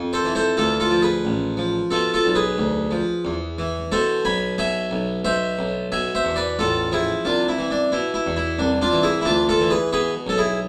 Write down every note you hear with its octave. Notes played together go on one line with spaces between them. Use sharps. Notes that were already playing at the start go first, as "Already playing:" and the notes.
Already playing: F2
A4 C5
E3
A4 C5
D2 F4 A4
F4 A4
F3
G#4 B4
A1
F3
B2 F4 A4
F4 A4
B1
G#4 B4
D2
F3
E2
E3
B2 A4 C5
B1 G#5 B5
B2 E5 G#5
B1
B2 C5 E5
B1
B2 E5 G#5
C5 E5
E2
B4 D5
A1 F4 A4
F3 E4 G#4
C2 D4 F4
E4
E3
D4
B2 E4
E4
E2
E4
C2 D4
D4 F4
E3
E4 G#4
E4
D2 D4 F4
F4 A4
E3
G#4 B4
B2 G#4 B4
B1 A4
E4 G#4